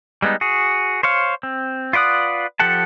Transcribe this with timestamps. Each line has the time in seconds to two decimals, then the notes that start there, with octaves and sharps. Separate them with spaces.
0.22 G3 G#3 B3 D#4
0.41 F#4 G#4
1.03 C5 C#5 F5
1.43 C4
1.93 F4 B4 D5 F#5 D#6
2.60 F3 G4 A4 F#5 A5